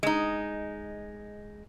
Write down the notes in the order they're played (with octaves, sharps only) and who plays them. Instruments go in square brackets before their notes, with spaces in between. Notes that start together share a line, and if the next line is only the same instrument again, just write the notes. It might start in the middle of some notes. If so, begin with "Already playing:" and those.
[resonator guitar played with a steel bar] G#3 D#4